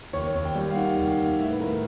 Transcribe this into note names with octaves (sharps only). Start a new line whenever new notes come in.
D#2 C#5
D#2
G5
G3
F5
D#3 F#5
D#2
F5
D#2
A2 E5
B4
A2 A#4